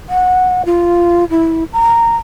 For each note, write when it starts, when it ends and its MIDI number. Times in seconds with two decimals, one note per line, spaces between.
0.09 0.65 78
0.65 1.24 65
1.30 1.63 64
1.72 2.16 82